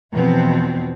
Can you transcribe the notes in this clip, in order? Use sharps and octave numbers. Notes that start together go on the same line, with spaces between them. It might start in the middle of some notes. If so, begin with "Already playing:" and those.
E2 B2 F3 B3 C4